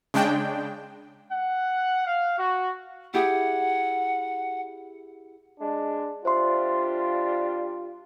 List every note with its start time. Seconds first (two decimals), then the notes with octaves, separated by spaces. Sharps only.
0.14 C#3 G#3 D4 G5
1.31 F#5
2.05 F5
2.38 F#4
3.14 E4 G4 G#4 F#5
5.60 G#3 D4
6.25 G3 D4 F4 C5 E5 C6